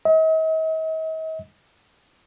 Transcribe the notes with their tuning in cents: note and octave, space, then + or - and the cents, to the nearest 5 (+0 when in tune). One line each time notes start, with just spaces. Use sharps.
D#5 +45